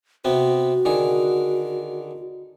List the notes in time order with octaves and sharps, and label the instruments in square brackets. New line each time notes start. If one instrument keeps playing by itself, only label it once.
[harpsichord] C3 B3 C4 [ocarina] F#4
[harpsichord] D3 D#3 G#4